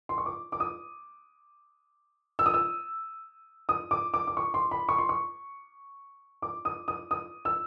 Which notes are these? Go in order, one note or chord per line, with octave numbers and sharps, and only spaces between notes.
C6
C#6
D6
D6
D#6
E6
D#6
E6
D#6
D6
D6
D6
C#6
C6
B5
C#6
C6
C#6
D6
D#6
D#6
D#6
E6